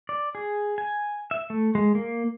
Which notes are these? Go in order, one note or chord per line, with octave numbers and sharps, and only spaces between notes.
D5
G#4
G#5
E5
A3
G#3
A#3